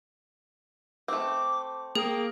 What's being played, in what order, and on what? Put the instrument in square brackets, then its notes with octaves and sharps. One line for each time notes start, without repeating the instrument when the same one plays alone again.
[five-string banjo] A3 C4 [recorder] D6
[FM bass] A#3 [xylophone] G#4 D#6 [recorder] G5